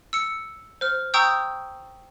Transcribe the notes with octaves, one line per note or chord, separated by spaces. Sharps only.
E6 C#7
C5 F6
G5 A#5 C#6 D#6 E6 G6